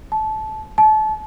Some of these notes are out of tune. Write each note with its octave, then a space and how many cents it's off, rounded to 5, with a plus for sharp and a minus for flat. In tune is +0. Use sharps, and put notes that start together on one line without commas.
A5 -20
A5 -30